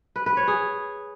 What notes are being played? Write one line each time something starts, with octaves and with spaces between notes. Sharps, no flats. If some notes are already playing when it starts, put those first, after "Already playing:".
B4
B4
C#5
G#4